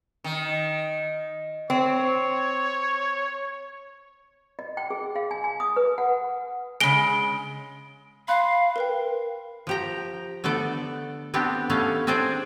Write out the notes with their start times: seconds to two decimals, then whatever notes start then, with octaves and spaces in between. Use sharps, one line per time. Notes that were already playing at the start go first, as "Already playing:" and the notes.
0.24 D#3
1.70 C4 C#5
4.59 D#5
4.77 G5
4.90 G#4
5.16 F5
5.31 G#5
5.44 G#5
5.60 D#6
5.76 B4
5.98 F#5
6.81 C#3 G#3 D7 G7
8.28 F5 B5 C6 F#6
8.76 A#4 B4 G5
9.67 F3 G4 A#5
10.44 D3 A3 B3 A4 D5
11.34 B3 C4 D4 G4
11.70 A3 B3 C#4 F5
12.07 C4 D4 G#4 C5 D5